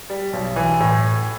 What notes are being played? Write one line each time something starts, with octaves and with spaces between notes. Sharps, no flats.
G3
B1
E3
A2